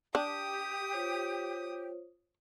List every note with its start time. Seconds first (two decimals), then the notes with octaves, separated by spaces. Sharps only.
0.15 D4 G4 D#6
0.92 F4 C5 C#5